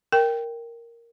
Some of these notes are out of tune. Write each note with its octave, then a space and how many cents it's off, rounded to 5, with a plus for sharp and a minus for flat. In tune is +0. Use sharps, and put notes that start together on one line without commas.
A#4 +0 G5 +0